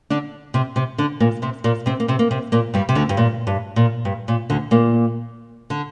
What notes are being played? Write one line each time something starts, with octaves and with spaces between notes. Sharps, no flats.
D3 D4
C3 C4
C3 C4
D3 D4
A#2 A#3
C3 C4
A#2 A#3
C3 C4
A#3
C3 C4
A#3
C3 C4
A#2 A#3
G2 G3
C3
D2 D3
G2
A#2
G2
A#2
G2
A#2
D2 D3
A#2 A#3
D3